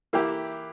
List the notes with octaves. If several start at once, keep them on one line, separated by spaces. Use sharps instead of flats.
E3 A#3 E4 G4